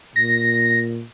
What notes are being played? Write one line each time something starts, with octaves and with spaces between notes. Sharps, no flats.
A#2 A#6